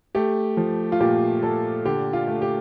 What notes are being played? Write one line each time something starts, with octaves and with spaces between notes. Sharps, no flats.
A3 G4
F3
F4
A#2 G4
A#2 A4
D3 G4
F4
A3
G4